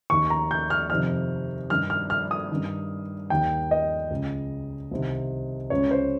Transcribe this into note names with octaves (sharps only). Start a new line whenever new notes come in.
D#2 D#3 C#6
A#5
G6
F6
F2 C3 D#3 F6
G2 D#3 F6
F6
F6
D#6
G2 D#3
D#2 D#3 G5
D#5
C#2 C#3
C2 C3 D#3
C#2 C#3 C#5
C5